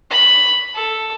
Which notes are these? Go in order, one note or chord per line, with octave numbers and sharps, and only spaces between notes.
B5
A4